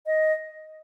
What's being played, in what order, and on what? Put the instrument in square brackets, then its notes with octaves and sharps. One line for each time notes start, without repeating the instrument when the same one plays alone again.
[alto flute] D#5